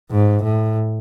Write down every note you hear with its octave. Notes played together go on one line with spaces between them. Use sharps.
G#2
A2